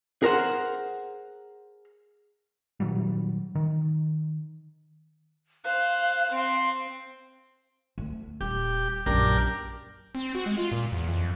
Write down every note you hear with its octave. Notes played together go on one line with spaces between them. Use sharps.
G#4 A#4 C5 F#5
A#2 D#3 F#3 G3
D#3
C5 F5 F#6
C4 C6
D2
D#1 G4
A#1 F#2 D4 G4 A#4
C4
F#4
G#3
F4
A#2
E2
F2